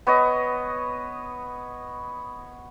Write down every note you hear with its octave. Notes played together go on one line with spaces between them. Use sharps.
B3 C#5 D#5